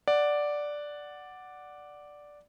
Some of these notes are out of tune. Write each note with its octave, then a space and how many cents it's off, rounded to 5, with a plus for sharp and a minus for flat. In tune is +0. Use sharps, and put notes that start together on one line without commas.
D5 +0 F#5 +0